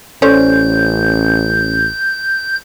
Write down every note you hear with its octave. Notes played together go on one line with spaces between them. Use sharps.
A1 C#4 A4 C5 D5 G6